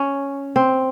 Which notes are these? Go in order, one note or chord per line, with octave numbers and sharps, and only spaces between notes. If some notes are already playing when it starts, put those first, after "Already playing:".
Already playing: C#4
C4